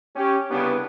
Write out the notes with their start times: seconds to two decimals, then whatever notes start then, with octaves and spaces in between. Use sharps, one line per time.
0.16 C#4 G4
0.51 C2 C#3 B3 D4 G4 B4